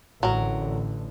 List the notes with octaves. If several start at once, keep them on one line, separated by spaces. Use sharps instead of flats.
A1 D3 F#3 A#4